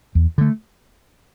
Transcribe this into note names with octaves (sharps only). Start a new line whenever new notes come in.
E2
D3 A3